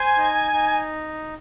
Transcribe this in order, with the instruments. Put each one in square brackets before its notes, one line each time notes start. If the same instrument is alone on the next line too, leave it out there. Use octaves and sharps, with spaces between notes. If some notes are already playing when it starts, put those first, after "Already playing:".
Already playing: [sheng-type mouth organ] C5 [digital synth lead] G#5
[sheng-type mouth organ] D#4
D#4